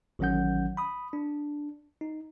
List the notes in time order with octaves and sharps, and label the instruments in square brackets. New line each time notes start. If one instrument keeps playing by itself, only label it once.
[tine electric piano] A1 D#3 F#3 C#4 F#5 G6
B5 D#6
D4
D#4